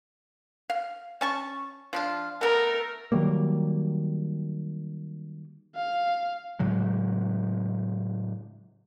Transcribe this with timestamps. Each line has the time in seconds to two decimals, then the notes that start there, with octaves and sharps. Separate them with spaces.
0.70 F5
1.21 C#4 A5 C#6
1.93 F3 D4 F4
2.41 A3 B3 A#4
3.12 D#3 F#3 G3 A#3
5.76 F5
6.59 A2 C#3 F#3 G#3